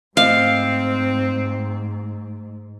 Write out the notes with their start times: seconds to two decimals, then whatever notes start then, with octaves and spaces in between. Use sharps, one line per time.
0.17 G#2 A3 C4 C5 D#5 F5